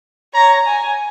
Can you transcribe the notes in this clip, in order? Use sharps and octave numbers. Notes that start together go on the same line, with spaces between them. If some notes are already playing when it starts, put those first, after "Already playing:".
C#5 A#5
G#5